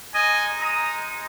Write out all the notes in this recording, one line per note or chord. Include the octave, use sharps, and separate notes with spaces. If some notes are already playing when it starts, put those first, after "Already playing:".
G#3 D#4 D#5 G#5
A#5 D#6